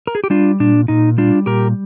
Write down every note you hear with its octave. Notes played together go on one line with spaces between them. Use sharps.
A#4
G#4
G4
G3 D4 F4
A#2 D4
A#2 D#4
G3 D4 F4
A#2 G4 A#4